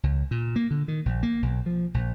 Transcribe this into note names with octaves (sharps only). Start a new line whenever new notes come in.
C#2
A#2
A#3
D3
D#3
A#1
A#3
B1
F3
A#1